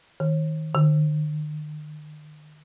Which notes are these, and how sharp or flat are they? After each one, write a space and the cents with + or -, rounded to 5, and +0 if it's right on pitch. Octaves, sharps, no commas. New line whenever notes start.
D#3 +15
D#3 -45